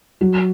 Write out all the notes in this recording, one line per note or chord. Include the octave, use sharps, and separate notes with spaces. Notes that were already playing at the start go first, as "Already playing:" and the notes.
F#3 F#4